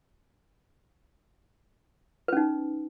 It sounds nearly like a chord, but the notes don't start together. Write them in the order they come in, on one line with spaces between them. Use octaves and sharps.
B4 C#4 D#4